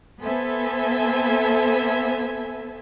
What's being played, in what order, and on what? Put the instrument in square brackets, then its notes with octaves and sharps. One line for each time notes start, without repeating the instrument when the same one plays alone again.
[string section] B3 A4 C5 E5 G#5